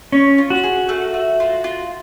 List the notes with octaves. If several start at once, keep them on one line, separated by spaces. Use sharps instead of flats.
C#4 C#5
F4
F#4
G#4
A3
A3
F4
F4